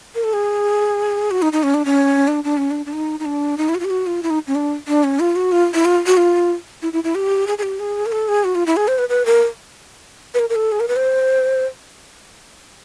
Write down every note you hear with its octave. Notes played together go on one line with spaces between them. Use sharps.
A#4
A4
G#4
F#4
D#4
D#4
C#4
D4
C#4
D4
D4
C#4
D4
D4
D#4
D#4
D4
D#4
E4
F#4
F4
G4
F#4
F4
E4
D#4
C#4
D4
D4
C#4
F4
F#4
F4
E4
F4
F#4
F4
E4
E4
E4
G4
G#4
G#4
G4
G#4
A#4
A4
G#4
F#4
F4
E4
G#4
C5
B4
B4
A#4
B4
A#4
A#4
A4
G#4
A#4
B4
C5